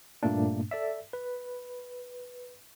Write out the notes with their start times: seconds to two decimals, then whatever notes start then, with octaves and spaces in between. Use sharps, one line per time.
0.23 G2 A#2 A3 A#3 D4
0.71 A4 D5 E5
1.13 B4